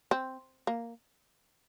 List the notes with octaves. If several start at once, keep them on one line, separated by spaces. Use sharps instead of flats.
C4
A#3